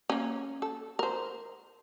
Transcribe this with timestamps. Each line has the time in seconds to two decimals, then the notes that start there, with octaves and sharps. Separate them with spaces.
0.10 A#3 C#4
0.62 A4
0.99 A#4 C5